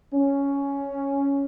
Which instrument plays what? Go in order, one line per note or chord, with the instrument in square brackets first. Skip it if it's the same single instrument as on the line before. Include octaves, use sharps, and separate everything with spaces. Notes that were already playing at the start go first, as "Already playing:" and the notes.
[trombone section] C#4